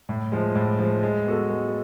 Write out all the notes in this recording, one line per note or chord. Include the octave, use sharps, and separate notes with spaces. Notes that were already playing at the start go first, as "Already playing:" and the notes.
A2
F3 G#3
A2
F3 G#3
G#3
B3 F#4 A4
G#3